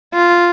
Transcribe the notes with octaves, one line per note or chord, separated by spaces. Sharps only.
F4